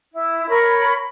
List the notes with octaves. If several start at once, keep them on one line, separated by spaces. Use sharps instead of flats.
E4
A#4 C#5 B5 C#6